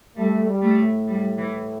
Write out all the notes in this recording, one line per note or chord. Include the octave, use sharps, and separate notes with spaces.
G3 A3
G3
A3
A2
G3
E3